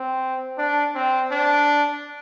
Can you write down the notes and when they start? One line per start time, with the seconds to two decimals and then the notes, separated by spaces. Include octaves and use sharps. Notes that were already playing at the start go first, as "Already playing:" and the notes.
Already playing: C4
0.58 D4
0.95 C4
1.31 D4